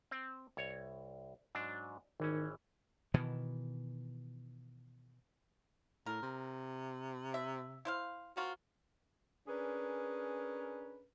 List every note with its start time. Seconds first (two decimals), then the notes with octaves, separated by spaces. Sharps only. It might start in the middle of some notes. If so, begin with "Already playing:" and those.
0.11 C4
0.57 C2 C#5
1.55 G#2 F#3 D4
2.20 G#1 D#3 E3 C#4
3.14 B2 D#3 E3
6.06 A2 A#4
6.22 C3
7.34 E5
7.85 E4 C5 F5
8.37 A#3 C4 F4 F#4
9.48 C#4 D4 G#4 A#4 B4